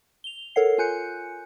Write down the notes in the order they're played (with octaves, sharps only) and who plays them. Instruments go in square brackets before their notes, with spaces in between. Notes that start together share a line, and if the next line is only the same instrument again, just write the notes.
[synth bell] F7 G7
A4 A#4 C#5 F#5 C7
F4 G#5 F#6 G6 C#7